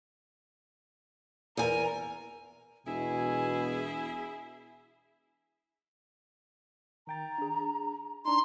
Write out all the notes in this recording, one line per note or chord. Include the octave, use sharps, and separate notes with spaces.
E2 A#4 G#5
E1 B2 E4 G#4 G#5
D#3 G5 A#5 A6
D4 G#4
D4 D#4 A#5 C6